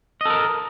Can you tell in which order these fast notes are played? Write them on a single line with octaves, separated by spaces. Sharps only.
D#5 A4 A#4